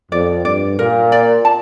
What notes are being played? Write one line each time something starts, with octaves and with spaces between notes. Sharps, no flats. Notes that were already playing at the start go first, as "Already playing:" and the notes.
F2 D5
G2 D5
A#2 A#4
D5
A5